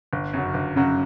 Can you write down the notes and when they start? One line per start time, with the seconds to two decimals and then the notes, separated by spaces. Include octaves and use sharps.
0.13 G1
0.34 F#2 C#3 F#3
0.54 G1
0.76 F#2 C#3 F#3